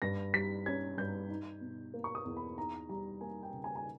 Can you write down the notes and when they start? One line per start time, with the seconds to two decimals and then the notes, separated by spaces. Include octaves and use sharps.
0.02 G2 A#6
0.34 G3 B6
0.66 C#4 G#6
0.98 G2 G6
1.29 D#4
1.61 B2
1.94 A#3
2.04 C#6
2.15 D#6
2.25 E2
2.37 B5
2.57 D#4 A#5
2.89 G3 A#5
3.21 A#3 G#5
3.43 G5
3.53 C#3
3.64 G#5
3.76 G#5